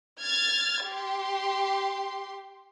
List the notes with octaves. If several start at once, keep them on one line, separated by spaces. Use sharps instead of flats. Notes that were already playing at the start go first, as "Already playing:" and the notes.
F6 G#6 A6
G4 C6